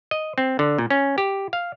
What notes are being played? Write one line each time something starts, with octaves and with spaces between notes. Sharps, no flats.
D#5
C4
D3
A#2
C#4
G4
F5